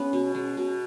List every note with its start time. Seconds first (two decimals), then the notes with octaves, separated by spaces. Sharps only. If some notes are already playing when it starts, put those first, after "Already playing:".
Already playing: G#3 B3 C#4
0.13 B2
0.35 G#3 C#4
0.57 B2